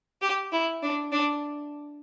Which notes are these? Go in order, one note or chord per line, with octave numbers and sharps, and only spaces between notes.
G4
E4
D4
D4